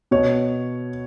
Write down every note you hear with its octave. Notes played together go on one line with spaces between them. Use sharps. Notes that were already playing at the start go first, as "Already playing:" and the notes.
B2 C#5